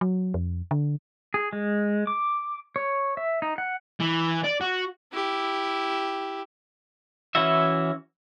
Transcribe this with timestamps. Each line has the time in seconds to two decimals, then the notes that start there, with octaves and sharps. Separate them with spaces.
0.01 F#3
0.34 F2
0.71 D3
1.34 G#4
1.53 G#3
2.07 D6
2.76 C#5
3.17 E5
3.42 D#4
3.58 F#5
4.00 E3
4.44 D5
4.61 F#4
5.13 E4 G4
7.35 E3 C#4 E4 F#4 E5